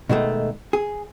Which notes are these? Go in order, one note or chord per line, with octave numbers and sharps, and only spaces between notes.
B2 D#3 G#3 A3
G#4